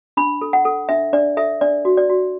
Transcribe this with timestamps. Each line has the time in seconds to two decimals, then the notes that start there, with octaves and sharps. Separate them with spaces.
0.17 D4 B5
0.41 A4
0.53 F#5
0.65 A4
0.89 D4 E5
1.13 D4 D5
1.37 A4 E5
1.61 D4 D5
1.85 F#4
1.97 D5
2.10 F#4